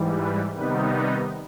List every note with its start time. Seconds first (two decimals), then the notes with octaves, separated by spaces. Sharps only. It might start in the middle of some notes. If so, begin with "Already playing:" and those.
Already playing: G#2 E3 G3
0.17 B4
0.54 C3 D#3 G3 B3 D#4 B4
0.92 B4